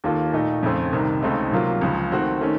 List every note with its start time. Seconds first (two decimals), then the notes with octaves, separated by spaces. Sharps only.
0.04 D#2 D#3 A#3 F4 A4
0.33 A#2 A3 D#4
0.63 F2 C#3 A3 C4
0.93 C2 C3 D#3
1.22 C#2 C#3 A3 C4 D#4
1.51 C3 F#3 A#3 F4
1.81 C#2 C#3 F3
2.11 D#3 A3 C4 F#4
2.41 D#3 A3 C#4